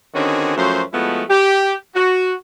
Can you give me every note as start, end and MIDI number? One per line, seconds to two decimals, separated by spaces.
0.15 0.56 50
0.15 0.56 51
0.15 0.56 60
0.15 0.56 61
0.15 0.56 66
0.15 0.56 68
0.56 0.82 42
0.56 0.82 53
0.56 0.82 54
0.56 0.82 57
0.56 0.82 72
0.93 1.23 53
0.93 1.23 56
0.93 1.23 57
0.93 1.23 59
0.93 1.23 64
0.93 1.23 66
1.29 1.75 67
1.95 2.33 66